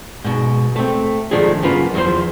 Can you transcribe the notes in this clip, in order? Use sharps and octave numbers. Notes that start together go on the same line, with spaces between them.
G#2 B2
A3 C4
G#2 D#3 F3 A3 D4 G#4
F#2 C#3 A#3 B3 F4 B4
E2 C#3 E3 F3 C5